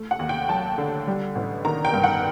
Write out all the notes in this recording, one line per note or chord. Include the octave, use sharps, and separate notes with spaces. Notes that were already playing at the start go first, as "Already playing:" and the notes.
Already playing: A3
F#5
D#2
G5
F#3 A5
D3
G3
A1
D#3 A#5
G5
G2
F#5